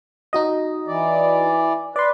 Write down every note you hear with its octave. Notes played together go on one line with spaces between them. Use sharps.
D#4 F#4 D#5
E3 D5
B4 D5 C6